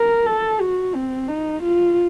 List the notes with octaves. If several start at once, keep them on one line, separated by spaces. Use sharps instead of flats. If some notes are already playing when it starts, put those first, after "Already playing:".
Already playing: A#4
A4
F#4
C4
D#4
F4